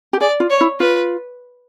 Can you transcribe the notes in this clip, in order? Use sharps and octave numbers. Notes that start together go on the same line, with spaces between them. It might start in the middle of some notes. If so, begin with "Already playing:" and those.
G4
G#4 D5
F4
C#5
E4
F4 B4